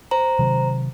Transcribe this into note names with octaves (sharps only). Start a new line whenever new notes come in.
C5 A#5
C3 D#3 F#3